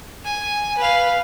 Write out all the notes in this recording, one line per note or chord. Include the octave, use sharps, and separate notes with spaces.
G#5
B4 F5